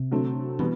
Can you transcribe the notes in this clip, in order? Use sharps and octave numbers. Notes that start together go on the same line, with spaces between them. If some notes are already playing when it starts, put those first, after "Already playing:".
Already playing: C3
D3 F#3 A3 C4
B2 E3 G3 B3